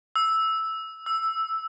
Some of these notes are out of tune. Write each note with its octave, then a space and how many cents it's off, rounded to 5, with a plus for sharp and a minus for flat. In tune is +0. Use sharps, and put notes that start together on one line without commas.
E6 -5
E6 +5